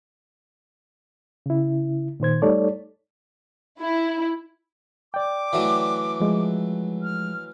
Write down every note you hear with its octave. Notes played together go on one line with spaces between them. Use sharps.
C#3 E4
A#2 D#3 C5 G#6
G3 A3 D#4 A4 C#5 D5
E4
D5 G5 D6
E3 F#3 A3
F3 G#3
F6